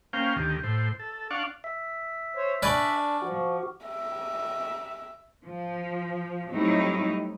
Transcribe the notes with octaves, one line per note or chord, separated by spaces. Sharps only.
A#3 C#4 C5 F5 G5
D2 D#3 G4
A2 C5
A4
D4 D5 F5 F#5 C#6
E5
C5 C#5
D4 B4 D5 G#5 C#6 D6 F6
F3 F#4
E5
F3
F#3 G3 A3 C4 D#4 E4